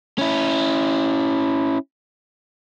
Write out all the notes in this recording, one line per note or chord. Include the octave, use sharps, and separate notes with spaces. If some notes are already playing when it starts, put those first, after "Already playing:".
C#4 E4